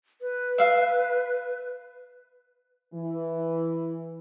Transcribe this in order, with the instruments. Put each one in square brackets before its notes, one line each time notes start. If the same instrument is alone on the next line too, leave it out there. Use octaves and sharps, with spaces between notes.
[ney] B4
[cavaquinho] E5 F5
[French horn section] E3